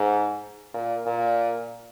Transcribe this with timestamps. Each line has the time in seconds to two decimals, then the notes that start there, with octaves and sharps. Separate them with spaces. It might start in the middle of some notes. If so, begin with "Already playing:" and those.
Already playing: G#2
0.74 A#2
1.06 A#2